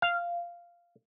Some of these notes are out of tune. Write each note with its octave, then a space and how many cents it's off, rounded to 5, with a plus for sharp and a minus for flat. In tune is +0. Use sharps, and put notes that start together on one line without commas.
F5 -10